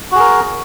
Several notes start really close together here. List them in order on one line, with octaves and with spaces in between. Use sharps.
F#4 G#4 A#4